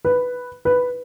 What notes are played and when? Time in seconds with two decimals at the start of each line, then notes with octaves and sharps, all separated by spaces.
0.05 B4
0.65 B4